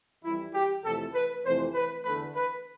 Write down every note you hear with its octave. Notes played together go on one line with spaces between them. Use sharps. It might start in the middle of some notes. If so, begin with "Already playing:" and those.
F2 E3 G3 E4
G4
F2 C3 E3 A3 A4
B4
F2 C3 E3 A3 C5
B4
E2 D3 A3 B4
B4